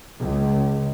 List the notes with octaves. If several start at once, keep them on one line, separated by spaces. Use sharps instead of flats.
C#2